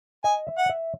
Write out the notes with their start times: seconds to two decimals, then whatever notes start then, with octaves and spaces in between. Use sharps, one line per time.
0.24 D#5 G#5
0.47 E5
0.58 F#5
0.69 E5